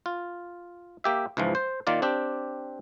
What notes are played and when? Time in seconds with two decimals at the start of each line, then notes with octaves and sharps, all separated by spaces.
0.06 F4
1.04 A#3 G4 E5
1.37 C#2 G#2 E3 F3
1.55 C5
1.87 D#3 A#3 F4 D5
2.02 C4 D4 G4